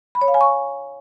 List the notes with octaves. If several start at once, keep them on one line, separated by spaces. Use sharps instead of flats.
B5
C#5
F5
G#5
C#6